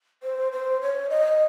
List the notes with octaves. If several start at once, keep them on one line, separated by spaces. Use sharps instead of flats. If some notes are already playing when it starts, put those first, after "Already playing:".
C5
C5
C#5
D#5